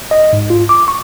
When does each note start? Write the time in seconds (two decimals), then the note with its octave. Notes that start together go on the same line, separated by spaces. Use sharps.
0.11 D#5
0.33 G#2
0.50 F4
0.69 D6
0.88 C#6